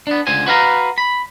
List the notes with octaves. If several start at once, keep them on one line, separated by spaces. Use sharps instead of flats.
B3 D4
C#2 D3 C5 G#5
F#4 B4 F5 A#5
B5